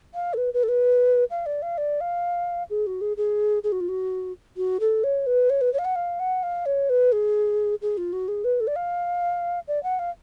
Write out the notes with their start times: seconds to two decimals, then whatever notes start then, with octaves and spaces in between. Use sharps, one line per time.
0.14 F5
0.34 A4
0.37 B4
0.54 B4
0.63 A4
0.69 B4
1.30 F5
1.46 D5
1.62 F5
1.78 D5
2.01 F5
2.70 G#4
2.87 F#4
3.01 G#4
3.17 G#4
3.64 G#4
3.72 F#4
3.81 F4
3.89 F#4
4.57 F#4
4.80 A4
5.04 C#5
5.26 B4
5.50 C#5
5.61 B4
5.74 C#5
5.79 F5
5.85 F#5
5.96 F5
6.20 F#5
6.43 F5
6.66 C#5
6.90 B4
7.12 G#4
7.82 G#4
7.98 F4
8.13 F#4
8.28 G#4
8.44 B4
8.60 A4
8.67 D5
8.76 F5
9.68 D5
9.83 F#5
9.99 F5